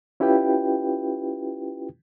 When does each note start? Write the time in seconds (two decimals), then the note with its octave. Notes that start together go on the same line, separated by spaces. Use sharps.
0.20 C#4 E4 F4 G4 B4 G5